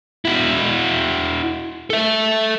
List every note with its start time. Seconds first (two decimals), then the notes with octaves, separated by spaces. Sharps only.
0.25 E4 F#4
1.90 A4 E5